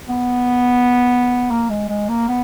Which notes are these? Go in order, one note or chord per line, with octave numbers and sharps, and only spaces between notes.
B3
A#3
G#3
G#3
A#3
B3